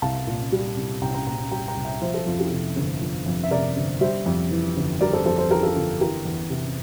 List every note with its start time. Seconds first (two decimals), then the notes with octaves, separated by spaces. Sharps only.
0.02 C2 F5 A5
0.27 A#2
0.52 G3
0.77 C2
1.01 C2 G5 A#5
1.14 G5 A#5
1.26 A#2 G5 A#5
1.51 G3 G5 A#5
1.68 G5 A#5
1.77 C2
1.85 E5 G5
2.02 F3 C5 E5
2.14 A4 C5
2.26 F2 F4
2.39 E4 G4
2.51 C3
2.76 G1
3.02 F3
3.26 F2
3.43 E5
3.51 C3 A#4 D5
3.76 G1
4.01 G3 C5 E5
4.26 F2
4.51 E3
4.76 G1
5.01 G3 A#4 D5
5.13 A4 C5
5.26 F2 A4 C5
5.38 A4 C5
5.50 E3 G4 A#4
5.63 F4 A4
5.75 G1 F4
6.01 E3 G4 A#4
6.25 E2
6.50 C3